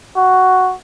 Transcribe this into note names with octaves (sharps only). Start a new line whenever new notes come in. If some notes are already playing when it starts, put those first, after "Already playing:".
F#4